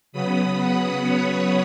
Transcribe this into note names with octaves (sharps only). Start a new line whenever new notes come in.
C#3 F#3 B3 B5 D#6
F#5 B5
C#5 F#5